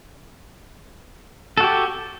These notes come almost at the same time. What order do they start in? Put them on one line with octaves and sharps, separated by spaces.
A4 F#4 G4